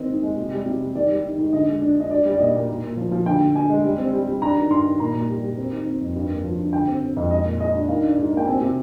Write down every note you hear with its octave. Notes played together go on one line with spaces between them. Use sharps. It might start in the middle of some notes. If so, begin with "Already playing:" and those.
Already playing: D#3 C4 D#5
G#2
G#3
C3
G3
C3
G3
D#3 D5
G3
D#3
G#2
D3 D#5
G#3
D4
D4 D#5
D4 D5
G3
D5
A#2 D#5
A#2
A#2
A#2
F3
F3
D3 G5
D3
D3 G#5
G#3
G3
C4
G3
G3
D4 A#5
D#3
G2 C6
D#3
A#2 A#5
A#2
G3
G3
C4
D#3
C4
F2
G2
A#3
F3
G2
D3 G5
C4
C4
F2
G#3 D#5
A#2
G#3 D#5
D4
D#3 F5
D4
G#2
A#3
G5
C4 G#5
C3